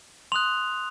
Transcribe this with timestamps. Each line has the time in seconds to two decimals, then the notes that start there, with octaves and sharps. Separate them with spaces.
0.32 C6 D#6 F#6 F7